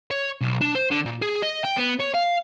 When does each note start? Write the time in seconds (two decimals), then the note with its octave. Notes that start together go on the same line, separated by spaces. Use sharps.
0.11 C#5
0.41 B1
0.61 D4
0.75 C5
0.91 D3
1.06 A#2
1.22 G#4
1.42 D#5
1.64 G5
1.77 B3
2.00 C#5
2.14 F5